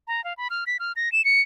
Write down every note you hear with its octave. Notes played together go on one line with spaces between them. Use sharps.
A#5
F5
B5
F6
B6
F6
A#6
E7
C#7